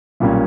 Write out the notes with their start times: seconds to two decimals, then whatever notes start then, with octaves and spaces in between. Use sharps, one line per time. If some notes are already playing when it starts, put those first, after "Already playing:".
0.20 B1 A#2 G3 A#3 C#4